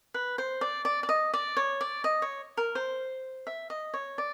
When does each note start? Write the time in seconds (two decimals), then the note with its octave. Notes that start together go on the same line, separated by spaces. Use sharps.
0.14 B4
0.38 C5
0.61 D5
0.85 D5
1.03 D5
1.09 D#5
1.33 D5
1.57 C#5
1.81 D5
2.04 D#5
2.22 C#5
2.57 A#4
2.75 C5
3.47 E5
3.70 D#5
3.94 C#5
4.18 D5